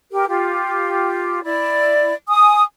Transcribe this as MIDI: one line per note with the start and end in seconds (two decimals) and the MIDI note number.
0.11 0.25 67
0.11 0.25 70
0.29 1.41 65
0.29 1.41 67
1.43 2.13 64
1.43 2.13 74
2.28 2.62 80
2.28 2.62 87